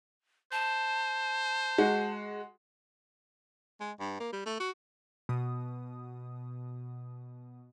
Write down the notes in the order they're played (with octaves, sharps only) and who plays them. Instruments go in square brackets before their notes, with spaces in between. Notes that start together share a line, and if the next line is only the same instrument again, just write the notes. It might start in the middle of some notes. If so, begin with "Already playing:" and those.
[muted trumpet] C5 [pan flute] A5
[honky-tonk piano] G#3 F#4
[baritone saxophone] G#3
G2
A#3
G3
A3
F#4
[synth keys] B2 D#6